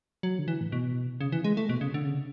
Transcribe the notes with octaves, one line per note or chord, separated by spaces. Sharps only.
F#3
D3
E3
A2
B2
C#3
E3
G#3
A3
B2
C#3
D3
C#3